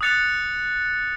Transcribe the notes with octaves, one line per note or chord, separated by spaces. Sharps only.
D#6 F#6 A6 C#7 F7